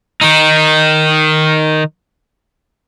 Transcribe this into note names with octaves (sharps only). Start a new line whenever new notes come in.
D#3 D#4